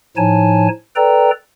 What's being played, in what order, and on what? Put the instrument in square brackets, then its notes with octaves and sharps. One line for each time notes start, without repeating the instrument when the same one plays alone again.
[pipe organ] A2 F3 D#4 C#5 G#5 A5
A4 B4 D5 G5 A#5